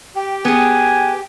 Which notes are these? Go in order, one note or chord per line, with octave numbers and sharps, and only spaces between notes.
G4 G5
B3 G#4 G#5